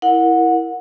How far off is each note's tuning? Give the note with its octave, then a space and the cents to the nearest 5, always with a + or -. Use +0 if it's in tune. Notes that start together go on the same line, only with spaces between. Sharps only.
E4 +0 A#4 +0 F#5 -20